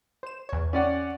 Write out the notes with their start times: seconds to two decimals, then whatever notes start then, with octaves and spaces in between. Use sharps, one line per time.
0.23 C5 E7
0.49 E2 C#5
0.73 C#4 D5 F#5